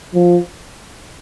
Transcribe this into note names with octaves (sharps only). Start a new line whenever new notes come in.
F3